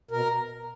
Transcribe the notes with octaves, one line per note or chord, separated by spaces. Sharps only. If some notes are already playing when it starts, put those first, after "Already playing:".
B2 A#4